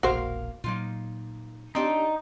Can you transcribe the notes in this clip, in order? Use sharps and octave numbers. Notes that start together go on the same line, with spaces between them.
E1 A#1 A#3 F#4 A#4 C5 F5
A#2 F#3 A#3 D#4 F4
C4 D4 D#4 G4